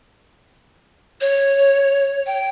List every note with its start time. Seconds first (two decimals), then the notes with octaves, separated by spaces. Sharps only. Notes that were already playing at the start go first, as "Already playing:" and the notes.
1.21 C#5
2.27 G5